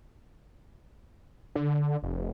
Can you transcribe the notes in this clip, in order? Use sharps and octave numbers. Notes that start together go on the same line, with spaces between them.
D3
F1